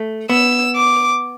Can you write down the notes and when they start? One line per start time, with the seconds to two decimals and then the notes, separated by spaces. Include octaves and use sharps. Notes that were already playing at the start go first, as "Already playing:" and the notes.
Already playing: A3
0.29 B3 E6
0.76 D6